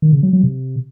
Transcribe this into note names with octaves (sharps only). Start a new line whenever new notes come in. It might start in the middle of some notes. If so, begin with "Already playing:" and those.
D#3
C#3
F#3
F#3
C3